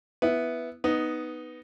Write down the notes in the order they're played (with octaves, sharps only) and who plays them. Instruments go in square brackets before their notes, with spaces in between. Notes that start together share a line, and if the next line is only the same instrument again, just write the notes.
[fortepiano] B3 E4
B3 D#4